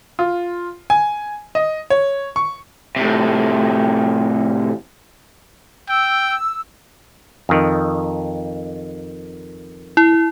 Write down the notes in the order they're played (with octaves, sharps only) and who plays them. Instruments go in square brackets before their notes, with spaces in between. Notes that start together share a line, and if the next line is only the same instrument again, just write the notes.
[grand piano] F4
G#5
D#5
C#5
C#6
[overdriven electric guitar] A2 C3
[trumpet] G5 [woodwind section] E6
[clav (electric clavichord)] F2 D#3
[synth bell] E4